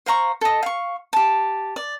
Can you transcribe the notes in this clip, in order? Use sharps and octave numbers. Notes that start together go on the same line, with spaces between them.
C5 F5 A#5 C#6
A4 D#5
F5 C#6
G4 A5
D5